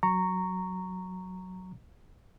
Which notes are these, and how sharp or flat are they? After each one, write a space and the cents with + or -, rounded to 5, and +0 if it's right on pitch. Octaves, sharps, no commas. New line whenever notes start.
F#3 +0 A#5 -10 C#6 +0